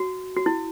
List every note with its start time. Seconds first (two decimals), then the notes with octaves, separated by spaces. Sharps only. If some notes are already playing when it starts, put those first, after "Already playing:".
Already playing: F#4
0.37 F#4
0.46 E4